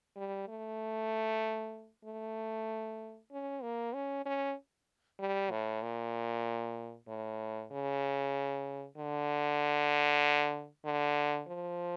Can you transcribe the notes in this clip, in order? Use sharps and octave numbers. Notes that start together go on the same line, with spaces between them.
G3
A3
A3
C#4
A#3
C#4
C#4
G3
A2
A#2
A2
C#3
D3
D3
F3